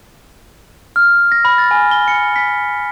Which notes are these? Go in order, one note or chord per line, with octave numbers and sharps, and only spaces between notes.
F6
A#6
B5
A6
G#5
G7
C#7
B6